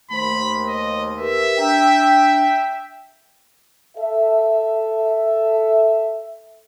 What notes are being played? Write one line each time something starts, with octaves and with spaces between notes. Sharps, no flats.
D#2 A3 C5 B5 C6
D#5
G4 A#4 B4 E5
D4 G5 A#5
A4 E5